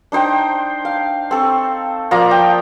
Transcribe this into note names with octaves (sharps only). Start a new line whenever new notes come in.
D4 D#4 C5 G5
F5
C4 A4 C#6
F3 A#3 D5 A#5
G5